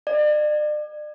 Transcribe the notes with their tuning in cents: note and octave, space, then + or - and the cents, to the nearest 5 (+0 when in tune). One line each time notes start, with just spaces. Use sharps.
D5 +40